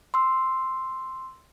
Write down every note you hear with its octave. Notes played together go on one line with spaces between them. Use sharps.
C6 E6